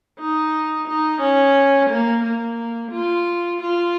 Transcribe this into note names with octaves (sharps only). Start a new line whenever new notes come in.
D#4
D#4
C#4
A#3
A#3
F4
F4